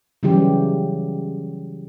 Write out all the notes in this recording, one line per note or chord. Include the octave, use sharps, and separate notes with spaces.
C#3 E3 F#3 G3 G4